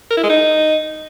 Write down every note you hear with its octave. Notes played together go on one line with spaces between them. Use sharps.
A#4
E4
G#3
D#4